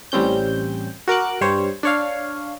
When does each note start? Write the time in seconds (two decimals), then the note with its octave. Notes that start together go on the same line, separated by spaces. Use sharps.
0.12 A1 G3 C4 C#4 G6
1.08 F#4 A#4 D6 F#6
1.41 G2 G3 C5 C#5
1.83 D4 C#5 F5